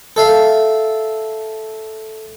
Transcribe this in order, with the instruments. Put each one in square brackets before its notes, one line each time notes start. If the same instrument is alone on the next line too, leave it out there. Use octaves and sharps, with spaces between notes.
[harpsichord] A4 E5 F5